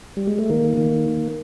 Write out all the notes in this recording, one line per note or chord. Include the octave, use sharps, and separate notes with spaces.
G3
G#3
A3
D#3 A#3
D#3